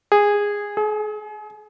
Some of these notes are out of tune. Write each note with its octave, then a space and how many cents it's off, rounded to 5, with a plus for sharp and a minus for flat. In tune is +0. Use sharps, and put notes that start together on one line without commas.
G#4 -15
G#4 +35